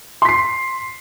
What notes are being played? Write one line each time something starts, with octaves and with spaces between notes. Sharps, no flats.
C6 B6 C7